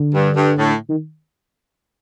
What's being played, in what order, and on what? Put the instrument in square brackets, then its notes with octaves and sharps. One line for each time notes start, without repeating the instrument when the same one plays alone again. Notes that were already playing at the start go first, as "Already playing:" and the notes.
Already playing: [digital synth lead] D3
[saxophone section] G2
G2
A2
[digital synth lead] D#3